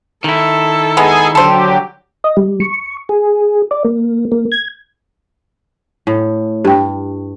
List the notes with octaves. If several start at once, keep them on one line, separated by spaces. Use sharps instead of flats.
D#3 E4 A4
G#3 B3 G#4 G#5
D3 F#3 G4 A4 C5
D#5
G3
C#6
G#4
D5
A#3
A#3
G#6
A2
G2 G4 G5